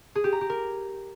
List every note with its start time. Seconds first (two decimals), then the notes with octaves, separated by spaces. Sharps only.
0.15 G#4
0.24 G4
0.32 A#5
0.41 G4
0.50 A#4